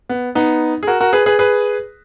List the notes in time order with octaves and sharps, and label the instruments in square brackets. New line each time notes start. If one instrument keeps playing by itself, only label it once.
[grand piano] B3
B3 D#4
G#4
F#4 A#4
F#4 A#4
G#4 B4
G#4 B4
G#4 B4